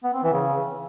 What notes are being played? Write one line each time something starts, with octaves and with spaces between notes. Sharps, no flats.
B3
C4
E3
C#3